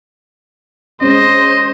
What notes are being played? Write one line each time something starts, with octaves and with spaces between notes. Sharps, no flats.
G#3 C#4 C5 D#5